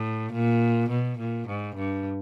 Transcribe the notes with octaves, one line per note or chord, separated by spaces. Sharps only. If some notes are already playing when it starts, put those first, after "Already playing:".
Already playing: A2
A#2
B2
A#2
G#2
G2